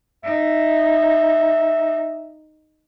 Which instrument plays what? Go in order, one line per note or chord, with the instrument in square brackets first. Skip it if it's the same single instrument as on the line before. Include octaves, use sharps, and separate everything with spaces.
[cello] D#4 [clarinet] E5